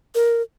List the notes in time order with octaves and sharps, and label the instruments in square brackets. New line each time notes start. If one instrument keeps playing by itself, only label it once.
[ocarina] A#4